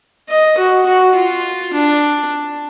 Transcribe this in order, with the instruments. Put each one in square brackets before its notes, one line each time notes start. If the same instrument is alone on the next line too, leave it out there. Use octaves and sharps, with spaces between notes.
[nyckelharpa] D#5
F#4
F#4
F4
D4